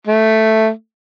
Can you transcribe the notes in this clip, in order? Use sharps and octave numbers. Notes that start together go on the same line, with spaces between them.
A3